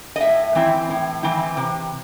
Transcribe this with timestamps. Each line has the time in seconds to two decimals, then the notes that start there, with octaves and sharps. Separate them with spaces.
0.16 D#5
0.21 A2 E5
0.55 E3 C4 E4
0.89 A2
1.23 E3 C4 E4
1.57 C3